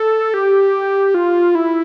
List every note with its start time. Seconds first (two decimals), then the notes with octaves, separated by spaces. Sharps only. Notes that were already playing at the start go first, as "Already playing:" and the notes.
Already playing: A4
0.34 G4
1.14 F4
1.55 E4